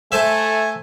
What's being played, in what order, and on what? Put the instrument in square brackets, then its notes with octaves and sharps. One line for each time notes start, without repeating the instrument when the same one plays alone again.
[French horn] A3 [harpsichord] A4 C5 E5 [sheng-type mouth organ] G#5